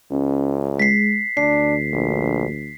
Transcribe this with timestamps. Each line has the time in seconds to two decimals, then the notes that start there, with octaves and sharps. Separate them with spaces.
0.11 C#2 C#4
0.80 G#3 B6 C7
1.37 D2 D4 C7
1.92 A#1